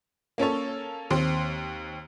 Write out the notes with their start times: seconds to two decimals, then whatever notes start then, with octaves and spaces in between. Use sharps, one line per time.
0.38 A#3 C#4 A4 C#5
1.10 D#2 C4 C6